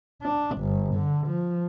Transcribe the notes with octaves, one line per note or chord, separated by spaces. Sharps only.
D4
G1
D3
F3